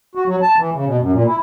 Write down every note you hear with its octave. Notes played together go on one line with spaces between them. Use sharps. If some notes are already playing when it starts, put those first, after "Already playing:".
F#4
F#3
A5
E3
C#3
B2
F#2
A#2
E4